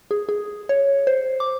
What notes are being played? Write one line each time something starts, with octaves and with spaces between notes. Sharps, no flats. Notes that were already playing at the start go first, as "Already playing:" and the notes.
G#4
G#4
C#5
C5
D6